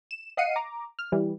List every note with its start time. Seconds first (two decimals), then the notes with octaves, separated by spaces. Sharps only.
0.11 E7
0.37 D#5 F5 F#5 C7 C#7 D#7
0.56 A#5 D6
0.99 F6
1.12 E3 G3